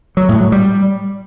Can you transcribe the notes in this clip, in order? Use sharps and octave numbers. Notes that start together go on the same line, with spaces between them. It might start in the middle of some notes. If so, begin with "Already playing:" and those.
F#3
A2
F#3
G3